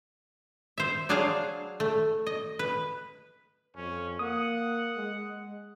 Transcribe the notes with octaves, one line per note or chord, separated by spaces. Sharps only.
C5 E5
F#3 D4 G#4 C5 F5
A3
D#5
B4
F2 C#4
A#3 F#5 D#6
G#3